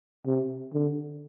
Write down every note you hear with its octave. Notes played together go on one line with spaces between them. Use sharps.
C3
D3